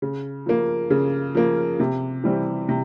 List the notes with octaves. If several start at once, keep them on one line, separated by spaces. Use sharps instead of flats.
C#3
F3 A#3
C#3
F3 A#3
C3
E3 G3 C4
C3